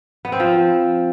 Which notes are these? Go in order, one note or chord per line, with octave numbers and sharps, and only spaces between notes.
B3
C4
F3